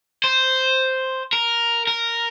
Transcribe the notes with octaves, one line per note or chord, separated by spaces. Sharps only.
C5
A#4
A#4